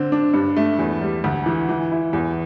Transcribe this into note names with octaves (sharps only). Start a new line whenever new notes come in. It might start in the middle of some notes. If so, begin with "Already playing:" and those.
Already playing: D3 C4
D4
G2
A3
E2
G3
D2
E3
E3
E4
E2